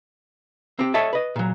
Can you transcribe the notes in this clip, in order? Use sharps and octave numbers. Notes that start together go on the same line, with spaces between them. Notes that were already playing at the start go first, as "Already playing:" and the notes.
C4 G4
A4 C#5 D#5 E5 A5
B4 D#5
A#2 F#3